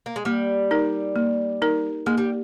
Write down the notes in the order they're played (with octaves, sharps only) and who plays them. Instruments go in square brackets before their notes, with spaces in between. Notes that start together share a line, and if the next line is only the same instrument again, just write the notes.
[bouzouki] A#3
G#3
[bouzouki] G3 [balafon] A#3
[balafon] D#4 A#4
A#3
D#4 A#4
[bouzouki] G#3 [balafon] A#3
[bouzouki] G3